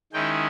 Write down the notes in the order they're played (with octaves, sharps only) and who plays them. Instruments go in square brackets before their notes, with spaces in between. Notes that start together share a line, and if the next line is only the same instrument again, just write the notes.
[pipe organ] D#3 G#3 C#4 E4 G5